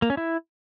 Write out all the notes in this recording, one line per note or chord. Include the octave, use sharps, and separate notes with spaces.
A#3
C#4
E4